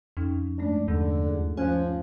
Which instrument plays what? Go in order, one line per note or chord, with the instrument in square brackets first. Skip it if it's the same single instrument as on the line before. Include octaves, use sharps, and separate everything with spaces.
[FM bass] F2 [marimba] F3 C#4 D#4
[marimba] G2 G#3 A3 [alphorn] D4
[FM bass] E2 [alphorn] D3
[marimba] D#2 F4 G#4
[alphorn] F3 [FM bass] C#4 [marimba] G#5 F#6 G#6